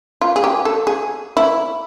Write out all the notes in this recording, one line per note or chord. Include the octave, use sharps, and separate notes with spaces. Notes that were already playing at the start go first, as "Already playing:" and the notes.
F4
G#4
G4
A4
G#4
E4